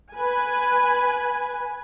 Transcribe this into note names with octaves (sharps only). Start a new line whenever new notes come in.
B4 G#5